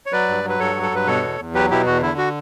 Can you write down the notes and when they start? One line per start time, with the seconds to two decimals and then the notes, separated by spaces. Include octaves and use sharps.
0.06 C#5
0.13 F#3 B4 D5
0.28 G2
0.44 F#3 B4
0.59 G2 A4 C#5
0.75 F#3
0.83 A4
0.91 G2 B4
1.07 B2 A4 C#5
1.23 E2
1.39 E2
1.55 F#3 G4 B4
1.71 B2 E4 G4
1.86 E2 F#4
2.02 D3 E4
2.18 F#4